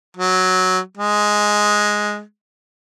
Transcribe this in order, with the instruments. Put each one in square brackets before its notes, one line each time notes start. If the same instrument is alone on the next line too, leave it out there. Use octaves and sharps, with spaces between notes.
[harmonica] F#3
G#3